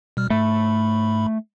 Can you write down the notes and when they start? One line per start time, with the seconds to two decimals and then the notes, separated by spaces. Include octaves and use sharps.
0.17 B2 G3 F6
0.30 G#2 A3 B5